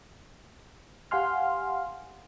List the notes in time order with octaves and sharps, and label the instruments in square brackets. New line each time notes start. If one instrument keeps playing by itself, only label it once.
[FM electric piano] G4 F5 F#5 G#5 C6 F6